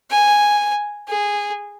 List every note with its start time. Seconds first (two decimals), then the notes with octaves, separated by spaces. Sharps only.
0.10 G#5
1.08 G#4